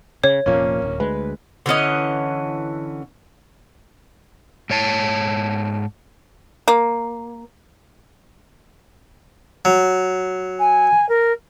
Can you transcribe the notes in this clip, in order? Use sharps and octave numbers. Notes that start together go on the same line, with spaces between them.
C#3 C#5
F1 A#2 F3 A#3 C#4
D1
D2 G#3 B4
D3 E3 C#4 D#5
G#2 C#5 A5
A#3
F#3
G#5
A#4